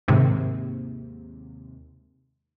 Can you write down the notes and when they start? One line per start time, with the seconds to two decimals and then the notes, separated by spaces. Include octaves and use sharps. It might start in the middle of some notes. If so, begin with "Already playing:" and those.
0.08 D#2 G#2 C3